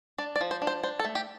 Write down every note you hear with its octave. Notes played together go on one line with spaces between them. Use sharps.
D4 D5
D5
F3
C5
D4
C5
D4 C5
A4
A3
G4